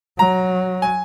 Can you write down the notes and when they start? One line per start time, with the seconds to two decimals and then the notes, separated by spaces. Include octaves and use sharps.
0.19 F#3 A#5
0.82 G#5